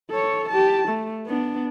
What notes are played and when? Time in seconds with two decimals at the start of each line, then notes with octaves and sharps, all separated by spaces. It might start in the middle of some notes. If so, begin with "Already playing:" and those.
0.10 A4 C#5
0.49 G4 A5
0.88 A3
1.26 B3 D4